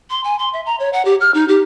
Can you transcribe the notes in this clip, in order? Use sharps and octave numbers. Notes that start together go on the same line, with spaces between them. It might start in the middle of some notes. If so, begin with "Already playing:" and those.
C6
G#5
C6
E5
A#5
C#5
F#5
G4
F6
D#4
G4